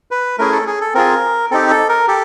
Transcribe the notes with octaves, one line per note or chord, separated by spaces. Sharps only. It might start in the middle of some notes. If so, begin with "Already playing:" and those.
B4
A3 C#4 E4 G#4 A#4
A4
G#4
A4
C4 F4 G#4 A#4
C4 D#4 G4 A4
A4
A#4
G4 A4